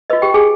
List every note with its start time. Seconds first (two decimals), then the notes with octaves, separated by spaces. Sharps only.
0.10 F4 B4 D#5
0.22 G4 G5
0.34 G#4 G#5